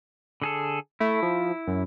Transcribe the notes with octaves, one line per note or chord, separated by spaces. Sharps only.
D3 G#4 A4
A3 E4
F3
F#2